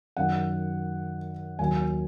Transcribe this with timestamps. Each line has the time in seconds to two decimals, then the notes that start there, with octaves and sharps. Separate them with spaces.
0.17 F#2 D#3 F#3 F#5
1.59 D#2 D#3 F#3 G#5